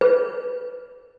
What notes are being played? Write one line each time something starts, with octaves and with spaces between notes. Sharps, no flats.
B4